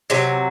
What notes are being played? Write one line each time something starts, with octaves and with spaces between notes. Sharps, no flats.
C3 F#3